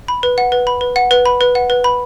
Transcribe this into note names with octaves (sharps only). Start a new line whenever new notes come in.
B5
B4
F#5
B4
B5
B4
F#5
B4
B5
B4
F#5
B4
B5